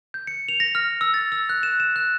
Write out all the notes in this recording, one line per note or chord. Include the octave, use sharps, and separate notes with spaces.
G6
C#7
F7
A#6
F6
E6
A6
E6
F#6
E7
E7
F#6